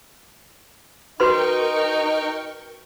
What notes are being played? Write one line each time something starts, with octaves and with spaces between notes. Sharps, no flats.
D#4 F#4 A#4 B4 D#5 G5 C6 C#6